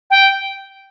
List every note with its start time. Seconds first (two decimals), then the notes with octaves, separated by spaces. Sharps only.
0.10 G5